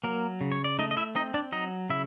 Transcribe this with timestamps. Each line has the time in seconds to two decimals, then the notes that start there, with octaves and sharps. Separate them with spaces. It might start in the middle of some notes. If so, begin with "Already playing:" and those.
0.04 F#3 A#3 A#4
0.41 C#3
0.52 C#5
0.64 D5
0.79 A3 D#4 D#5
0.91 D#5
0.97 E4 E5
1.15 C4 D#4 D#5
1.34 D4 D5
1.52 F#3 D#4 D#5
1.90 C#3 E4 E5